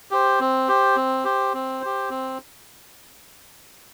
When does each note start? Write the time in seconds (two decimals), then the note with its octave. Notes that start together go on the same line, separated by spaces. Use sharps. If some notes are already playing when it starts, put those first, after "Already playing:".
0.11 G4 C5
0.40 C4
0.68 G4 C5
0.96 C4
1.25 G4 C5
1.54 C4
1.81 G4 C5
2.10 C4